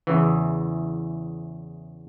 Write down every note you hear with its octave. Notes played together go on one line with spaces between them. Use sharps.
E2 C#3 E3